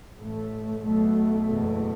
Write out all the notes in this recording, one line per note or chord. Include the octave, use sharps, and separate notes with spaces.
A1 A2 A3
B1 B2 A3
F#1 E2 B2